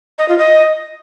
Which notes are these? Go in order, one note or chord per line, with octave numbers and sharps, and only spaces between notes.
D#5
F4
D#5